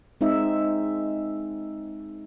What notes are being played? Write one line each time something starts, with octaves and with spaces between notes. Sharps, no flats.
G#3 C4 D#4 E5